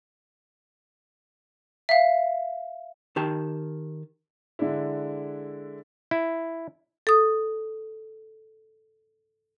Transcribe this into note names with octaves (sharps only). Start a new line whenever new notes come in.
E5 F5
D#3 G4 A5
D3 G#3 D4 E4
E4
A4 D#6